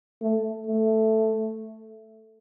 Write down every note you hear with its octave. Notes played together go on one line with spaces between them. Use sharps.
A3
A3